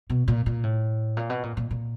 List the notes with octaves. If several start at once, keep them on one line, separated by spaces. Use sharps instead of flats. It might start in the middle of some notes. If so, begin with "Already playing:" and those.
B2
A#2
A#2
A2
A#2
B2
A#2
A#2
A#2